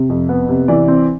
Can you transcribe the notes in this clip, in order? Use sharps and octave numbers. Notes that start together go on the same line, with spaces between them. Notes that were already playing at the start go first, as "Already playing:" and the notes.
Already playing: C3
F2
B3
C3
E3 D5
C4